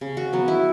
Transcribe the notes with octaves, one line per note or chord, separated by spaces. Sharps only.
C#3
F#4
F#3 B3
E4